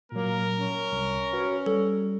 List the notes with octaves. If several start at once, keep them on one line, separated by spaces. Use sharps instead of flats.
A#2 F#3 A#3 A#4
C#4
C2
F#4 B4 C#5
G3 A4